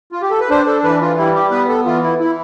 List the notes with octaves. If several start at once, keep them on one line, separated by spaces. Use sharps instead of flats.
F4
G4
A4
B4
D4 C5
A4
E3 B4
F4
G3 E4
G4
B3 B4
A4
E3 F4
E4
E3 E4